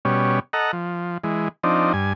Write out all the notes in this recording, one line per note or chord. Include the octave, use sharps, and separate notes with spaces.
B2 G3 C#4
A4 D#5 F#5 A#5
F3
E3 G#3
F3 C4 D4 D#4
G2 G#5